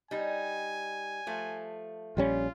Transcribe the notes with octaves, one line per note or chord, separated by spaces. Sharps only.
G3 D#4 G#5
F3 A3
A#1 G3 C#4 F4